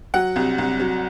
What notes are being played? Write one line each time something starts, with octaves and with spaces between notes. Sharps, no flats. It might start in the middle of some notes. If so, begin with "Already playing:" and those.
F#3 F#5
C2
C2
F#3